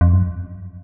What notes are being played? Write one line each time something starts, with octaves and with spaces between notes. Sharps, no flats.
F2
F#2